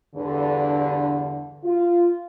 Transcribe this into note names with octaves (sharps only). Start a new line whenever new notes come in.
E2 G2 D3
F4